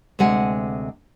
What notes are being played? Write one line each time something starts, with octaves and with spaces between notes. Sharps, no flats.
D2 C3 G#3 F#5 G#5